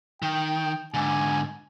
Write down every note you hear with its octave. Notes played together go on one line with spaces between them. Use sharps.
D#3 G5
G#2 D3 G#5